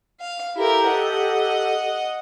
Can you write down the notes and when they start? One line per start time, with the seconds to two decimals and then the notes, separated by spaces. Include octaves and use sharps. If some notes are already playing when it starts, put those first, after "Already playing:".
0.20 F5
0.56 E4 G4 A4 A#4
0.88 D#5 F#5